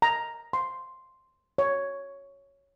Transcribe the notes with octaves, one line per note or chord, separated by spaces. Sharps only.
A#5
C6
C#5